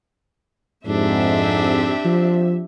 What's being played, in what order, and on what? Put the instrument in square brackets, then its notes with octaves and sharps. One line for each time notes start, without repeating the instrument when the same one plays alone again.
[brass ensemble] F2 G#2 [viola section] C4 G4 E5 [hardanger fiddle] D4
[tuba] F3